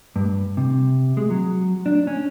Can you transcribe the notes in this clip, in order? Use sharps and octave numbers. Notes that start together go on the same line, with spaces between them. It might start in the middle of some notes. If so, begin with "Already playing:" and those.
G2
C3
G#3
F#3
D4
C#4